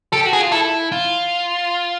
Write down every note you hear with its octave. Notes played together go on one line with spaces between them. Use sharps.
G4 A4
F#4
G#4
F4
E4 A4
F4